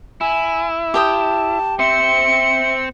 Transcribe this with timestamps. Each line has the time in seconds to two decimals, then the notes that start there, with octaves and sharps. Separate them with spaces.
0.21 E4 G#5
0.94 G4 G5 A5 D#6
1.79 C4 C5 E5 C#7